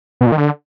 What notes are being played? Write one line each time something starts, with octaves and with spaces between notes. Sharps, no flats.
B2
A#2
D#3
D3